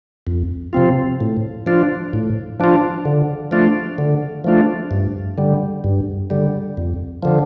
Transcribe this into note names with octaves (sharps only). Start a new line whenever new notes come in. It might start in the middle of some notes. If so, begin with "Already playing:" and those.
F2
C3 F3 C4 F4
A2
F3 D4 F4
A2
F3 D4 F4
D3
F3 A3 D4 F4
D3
F3 A3 D4 F4
G2
D3 G3
G2
D3 G3
F2
D3 F3